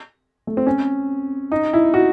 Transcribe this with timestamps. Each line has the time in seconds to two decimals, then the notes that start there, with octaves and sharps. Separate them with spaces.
0.47 A3
0.57 C4
0.66 C#4
1.52 D#4
1.73 E4
1.94 F#4